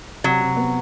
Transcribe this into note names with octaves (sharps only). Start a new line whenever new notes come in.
C3 F#3
C3
B3